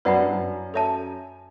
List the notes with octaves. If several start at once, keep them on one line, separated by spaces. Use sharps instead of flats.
F#2 B4 D5 F#5 B5
G2
F#2
A4 C#5 E5 A5